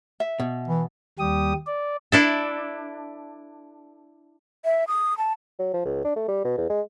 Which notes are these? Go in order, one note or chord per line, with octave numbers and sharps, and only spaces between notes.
E5
B2
E3
D#2 G3 G4 D#6
D5
D4 E4 A4
E5
D#6
A5
F#3
F3
C#2
D4
A3
G3
B2
E2
G#3